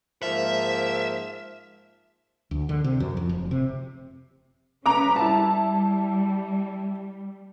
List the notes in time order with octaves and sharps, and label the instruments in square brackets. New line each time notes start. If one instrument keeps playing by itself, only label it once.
[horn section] G#2 F3 A#3 [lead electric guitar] E5
[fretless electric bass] D2
D3
C3
F#2
F2
F1
C3
[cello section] C#4 B4 [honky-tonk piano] A#5 D6
[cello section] G3 [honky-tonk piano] E4 A5